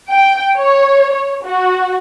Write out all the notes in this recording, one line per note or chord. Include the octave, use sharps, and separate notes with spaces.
G5
C#5
C#5
F#4